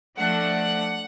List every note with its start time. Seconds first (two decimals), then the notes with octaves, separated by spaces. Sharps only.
0.17 F3 A3 D4 F#5